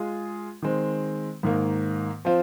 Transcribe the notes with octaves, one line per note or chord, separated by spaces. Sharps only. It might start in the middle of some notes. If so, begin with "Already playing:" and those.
Already playing: G#3 F4 G#4
D#3 G#3 C4
G#2 D#3 A#3
F3 C4 F4